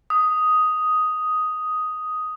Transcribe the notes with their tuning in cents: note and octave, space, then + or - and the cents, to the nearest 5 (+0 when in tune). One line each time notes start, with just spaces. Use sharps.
D#6 +5